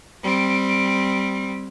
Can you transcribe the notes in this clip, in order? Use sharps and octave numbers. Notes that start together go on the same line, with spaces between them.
G3 C4